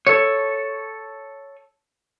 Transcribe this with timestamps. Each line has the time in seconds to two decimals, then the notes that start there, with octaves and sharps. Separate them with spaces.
0.07 A4 C#5